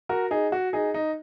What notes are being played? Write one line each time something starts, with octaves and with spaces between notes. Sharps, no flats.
F#4 A#4
D#4 G#4
F#4
D#4 G#4
D#4